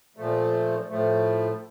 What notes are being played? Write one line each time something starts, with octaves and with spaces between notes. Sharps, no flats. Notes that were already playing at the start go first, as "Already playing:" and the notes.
A#2 F3 A3
A2 F3 A3